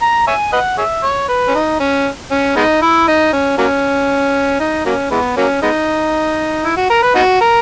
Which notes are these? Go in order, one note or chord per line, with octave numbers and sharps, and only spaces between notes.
A#5
C#5 E5 G#5
B4 D#5 F#5
G#4 C#5 E5
C#5
B4
C#4
D#4
C#4
C#4
G#3 B3 D#4
E4
D#4
C#4
F#3 A#3 C#4
D#4
F#3 A#3 C#4
E3 G#3 B3
F#3 A#3 C#4
G#3 B3 D#4
E4
F#4
A#4
B4
B3 D#4 F#4
A#4